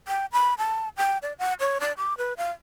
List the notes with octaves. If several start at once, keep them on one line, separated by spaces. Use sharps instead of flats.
G5
B5
A5
G5
D5
F#5
C#5
D5
D6
B4
F5